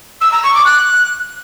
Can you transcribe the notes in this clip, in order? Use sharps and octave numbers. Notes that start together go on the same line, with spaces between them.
E6
A#5
C#6
D6
F#6